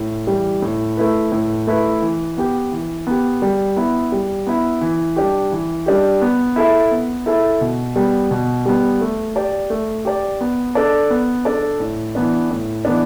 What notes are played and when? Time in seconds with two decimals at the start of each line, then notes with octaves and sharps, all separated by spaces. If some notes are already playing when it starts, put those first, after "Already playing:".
Already playing: A2
0.27 E3 G3
0.62 A2
0.97 A3 E4 B4
1.32 A2
1.67 A3 E4 B4
2.02 E3
2.37 B3 G4
2.72 E3
3.07 B3 G4
3.42 G3
3.76 B3 E4
4.12 G3
4.47 B3 E4
4.81 E3
5.16 G3 D4 G4
5.52 E3
5.86 G3 D4 G4
6.22 B3
6.56 E4 A4 E5
6.91 B3
7.26 E4 A4 E5
7.61 B2
7.96 G3 B3
8.31 B2
8.66 G3 B3
9.01 A3
9.36 G4 D5
9.70 A3
10.05 G4 D5
10.41 B3
10.75 D4 A4 D5
11.10 B3
11.45 D4 A4 D5
11.80 A2
12.15 E3 B3 D4
12.50 A2
12.85 E3 B3 D4